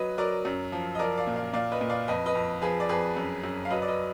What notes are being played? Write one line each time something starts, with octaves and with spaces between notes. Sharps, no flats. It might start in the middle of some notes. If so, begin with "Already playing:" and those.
Already playing: F#3 B4 D#5
F#3 A#4 D5
F#2
F3
D#5
F3 A#4 D5
D5 F5
A#2
D5 F5
A#2 D5 F5
B4 D#5
A#2
D5 F5
F2 B4 D#5
B4 D#5
F2
F3 G#4 B4
D5
F2 G#4 B4
F#2
F#2
F5
F#3 B4 D#5
D5
B4 D#5